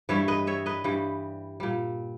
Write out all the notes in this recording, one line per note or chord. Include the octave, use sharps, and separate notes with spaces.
G2 E3 G3 C#5 E5
B4 D#5
C#5 E5
B4 D#5
G2 E3 G3
A#2 G3